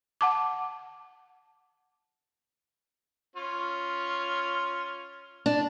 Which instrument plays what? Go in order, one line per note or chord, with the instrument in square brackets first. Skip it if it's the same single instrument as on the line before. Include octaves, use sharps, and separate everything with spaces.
[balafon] F#5 A5 D6
[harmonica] C#4 F4
[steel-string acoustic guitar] D4